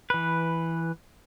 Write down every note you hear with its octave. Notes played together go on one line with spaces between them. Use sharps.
E3 B4